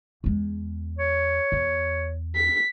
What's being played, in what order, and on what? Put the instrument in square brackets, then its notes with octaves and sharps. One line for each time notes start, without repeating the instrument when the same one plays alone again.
[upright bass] E2 G#3
[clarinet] C#5
[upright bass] E2
[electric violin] B6